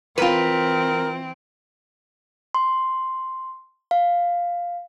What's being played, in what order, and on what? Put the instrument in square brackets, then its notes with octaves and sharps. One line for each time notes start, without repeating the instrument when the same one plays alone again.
[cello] E3 C4 [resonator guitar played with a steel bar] F4 B4 [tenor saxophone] A#4
[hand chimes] C6
F5